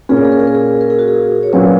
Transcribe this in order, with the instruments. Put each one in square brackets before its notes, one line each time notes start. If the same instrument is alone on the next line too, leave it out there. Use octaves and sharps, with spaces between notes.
[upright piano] A#2 A#3 C#4 [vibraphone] G#4
[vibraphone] A#4
G#4
A#4
G#4
A#4
G#4
A#4
G#4
F#4
G#4
C#5
[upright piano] A#2 F#3 C#4 F#4 [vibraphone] B4